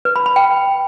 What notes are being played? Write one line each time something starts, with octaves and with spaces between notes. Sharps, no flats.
B4
B5
B5
G5